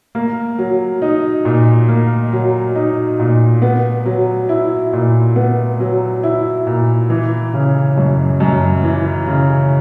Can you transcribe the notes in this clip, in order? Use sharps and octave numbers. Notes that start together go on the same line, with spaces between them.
A#3
F#3
D#4
A#2
A#3
F#3
D#4
A#2
B3
F#3
E4
A#2
B3
F#3
E4
A#2
E3
C#3
F#2
F#2
E3
C#3